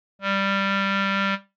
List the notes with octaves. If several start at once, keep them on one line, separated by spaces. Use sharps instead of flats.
G3